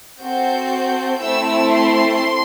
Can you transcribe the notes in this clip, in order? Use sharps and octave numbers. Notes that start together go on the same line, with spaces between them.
C4 F#4 A4 G6
A3 C4 E4 E6
C6